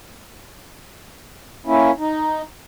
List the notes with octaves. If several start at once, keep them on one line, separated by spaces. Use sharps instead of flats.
A#3 C#4 E4
D#4